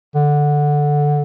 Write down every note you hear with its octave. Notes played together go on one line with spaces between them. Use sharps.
D3